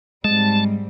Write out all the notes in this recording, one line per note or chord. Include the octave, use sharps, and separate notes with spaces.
G#2 G3 G#3 C4 A5